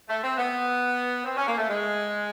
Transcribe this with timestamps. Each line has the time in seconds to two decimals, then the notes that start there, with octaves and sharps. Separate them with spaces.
0.08 A3
0.23 C4
0.37 B3
1.24 C4
1.37 C#4
1.47 A#3
1.57 A3
1.69 G#3